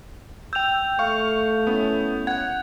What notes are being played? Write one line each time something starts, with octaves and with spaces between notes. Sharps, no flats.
G5 E6 G6 F7
A3 F5 C#6
B3 C#4 E4
F#5 G#6